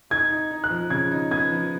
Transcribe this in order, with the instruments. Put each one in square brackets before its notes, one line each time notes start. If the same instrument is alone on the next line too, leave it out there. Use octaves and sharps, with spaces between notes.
[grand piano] D#4 [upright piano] G#6
[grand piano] D#4
D#4
[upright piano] F#6
[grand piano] F3
[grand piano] C#3 [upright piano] G#6
[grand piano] D#4
[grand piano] B3 [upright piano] G#6
[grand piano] F3